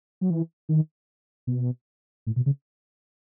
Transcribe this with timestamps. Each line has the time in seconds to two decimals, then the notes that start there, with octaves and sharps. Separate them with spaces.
0.21 F#3
0.30 E3
0.69 D#3
1.47 B2
2.27 A2
2.36 B2
2.46 C#3